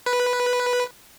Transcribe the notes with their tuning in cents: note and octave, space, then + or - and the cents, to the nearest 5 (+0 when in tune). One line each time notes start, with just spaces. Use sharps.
B4 -5